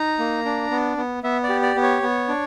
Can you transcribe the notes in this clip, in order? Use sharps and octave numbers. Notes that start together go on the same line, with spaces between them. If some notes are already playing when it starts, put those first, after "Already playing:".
Already playing: D#4 A#5
A#3
D4
B3
B3
B3 E5
D5
G4
D5
B3
C#5
B3
D4